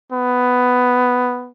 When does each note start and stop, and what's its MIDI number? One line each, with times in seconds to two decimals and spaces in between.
0.12 1.50 59